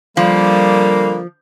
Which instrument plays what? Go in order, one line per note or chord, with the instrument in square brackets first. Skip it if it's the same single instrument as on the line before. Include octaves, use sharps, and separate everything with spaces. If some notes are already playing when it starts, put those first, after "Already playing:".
[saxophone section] D3 A#3 [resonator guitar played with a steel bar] F3 [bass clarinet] G3